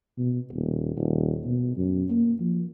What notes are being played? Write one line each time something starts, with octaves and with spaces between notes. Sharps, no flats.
B2
D#1
D#1
B2
F#2
A#3
F3